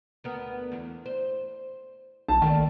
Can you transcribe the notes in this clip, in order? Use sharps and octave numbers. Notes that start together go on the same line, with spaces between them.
D2 B3 A#4
E2
C5
B1 A5
D#3 A3 A#3 D4